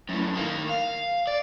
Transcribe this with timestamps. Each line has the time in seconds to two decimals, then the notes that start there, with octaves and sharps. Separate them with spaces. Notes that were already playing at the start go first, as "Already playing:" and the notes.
0.09 F#2 A2
0.35 D#3 A#3
0.69 F5
1.27 D5